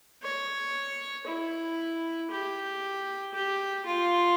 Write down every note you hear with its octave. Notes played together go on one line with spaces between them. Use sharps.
C#5
E4
G4
G4
F4